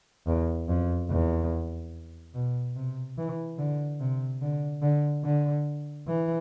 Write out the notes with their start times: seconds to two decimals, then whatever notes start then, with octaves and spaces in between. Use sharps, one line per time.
0.27 E2
0.69 F2
1.10 E2
2.35 B2
2.76 C3
3.18 E3
3.59 D3
4.01 C3
4.42 D3
4.82 D3
5.25 D3
6.07 E3